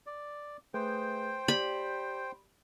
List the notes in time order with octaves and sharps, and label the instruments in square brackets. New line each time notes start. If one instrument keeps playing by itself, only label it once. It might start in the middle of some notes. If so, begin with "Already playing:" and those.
[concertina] D5
[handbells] A3 G#4 B4 [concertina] C5 G5
[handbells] G4 D5 [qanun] B5